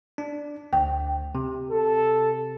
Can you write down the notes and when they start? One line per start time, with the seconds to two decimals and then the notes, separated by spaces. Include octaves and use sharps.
0.18 D4
0.73 D2 G5
1.35 C3
1.71 A4